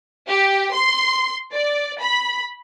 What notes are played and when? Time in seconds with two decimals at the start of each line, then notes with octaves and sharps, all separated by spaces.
0.28 G4
0.73 C6
1.52 D5
2.00 B5